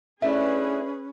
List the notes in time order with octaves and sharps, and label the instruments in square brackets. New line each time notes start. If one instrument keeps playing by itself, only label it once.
[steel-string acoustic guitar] A3 D4 E4 [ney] C#4 [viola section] G#4 B4 [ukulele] E5